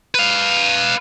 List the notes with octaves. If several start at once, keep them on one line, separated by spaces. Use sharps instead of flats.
B4 F5